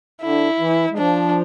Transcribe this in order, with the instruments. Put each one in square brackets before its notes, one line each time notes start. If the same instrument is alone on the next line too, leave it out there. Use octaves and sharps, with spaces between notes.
[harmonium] D3 [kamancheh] E4
[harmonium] E3
G#3
[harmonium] F3 [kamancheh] D4